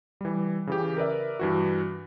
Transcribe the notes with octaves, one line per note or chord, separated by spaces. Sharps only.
E3 G3
C#3 E3 G4
A#4 B4 D5 E5
G2 E3 F#4